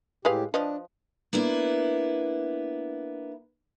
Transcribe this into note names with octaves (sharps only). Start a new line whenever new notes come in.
A2 G#3 G4 B4 F5
F3 D4 B4 D#5
A#3 B3 D4 E4